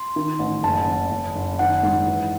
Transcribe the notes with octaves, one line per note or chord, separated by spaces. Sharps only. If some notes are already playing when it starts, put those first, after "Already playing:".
Already playing: C6
D#3
A1
F#1 A5
F#1
F#1
F#1
D#3 F#5
G#2
E3